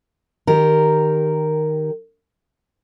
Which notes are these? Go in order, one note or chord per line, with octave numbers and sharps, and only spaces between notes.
D#3 G4 A#4